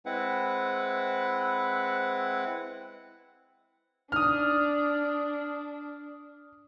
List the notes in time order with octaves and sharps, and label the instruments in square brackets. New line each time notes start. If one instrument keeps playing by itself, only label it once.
[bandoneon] G#3 C4 E4 B4 F#5
[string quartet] D4 [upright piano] D#6 F6